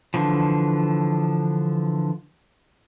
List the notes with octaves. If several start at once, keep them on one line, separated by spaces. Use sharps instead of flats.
D3 E3 F3